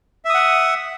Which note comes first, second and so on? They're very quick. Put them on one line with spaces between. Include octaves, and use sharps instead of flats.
E5 D#6 F#5